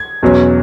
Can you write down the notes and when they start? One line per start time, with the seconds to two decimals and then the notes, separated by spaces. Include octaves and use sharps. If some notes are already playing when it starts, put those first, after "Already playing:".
Already playing: G#6
0.23 E2 B2 F#3 C#4